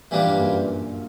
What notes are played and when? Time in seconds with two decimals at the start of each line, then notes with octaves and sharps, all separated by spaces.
0.11 A#2 E3 G3 A#3 D4
0.25 G2
0.38 F#2 A#2